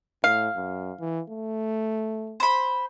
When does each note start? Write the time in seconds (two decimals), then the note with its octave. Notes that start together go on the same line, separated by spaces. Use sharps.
0.24 A2 F5
0.56 F#2
1.00 E3
1.30 A3
2.40 C5 B5